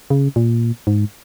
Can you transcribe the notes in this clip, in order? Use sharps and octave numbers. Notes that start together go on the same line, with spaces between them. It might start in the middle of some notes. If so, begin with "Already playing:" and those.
C#3
A#2
G#2